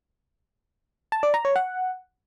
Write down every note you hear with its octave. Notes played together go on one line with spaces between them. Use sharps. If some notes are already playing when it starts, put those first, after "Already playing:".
A5
D5
A#5
C#5
F#5